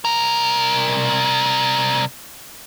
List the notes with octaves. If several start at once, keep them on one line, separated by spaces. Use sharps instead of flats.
C2 A#4